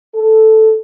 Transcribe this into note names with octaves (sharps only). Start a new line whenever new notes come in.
A4